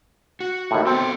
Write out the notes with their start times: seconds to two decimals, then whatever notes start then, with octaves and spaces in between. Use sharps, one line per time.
0.40 F#4
0.71 D#2 A2
0.87 B3 C4 A4